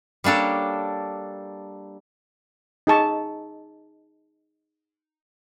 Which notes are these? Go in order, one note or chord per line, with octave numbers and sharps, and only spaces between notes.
G3 A#3 D4 A4 C#5
D#4 G#4 A5 C#6